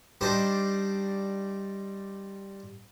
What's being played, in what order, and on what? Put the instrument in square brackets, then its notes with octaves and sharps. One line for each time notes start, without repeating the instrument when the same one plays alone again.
[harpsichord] G3 D4 D#4 C5